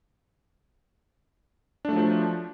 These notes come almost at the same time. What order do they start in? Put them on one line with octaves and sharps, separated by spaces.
D4 A3 F#3 F3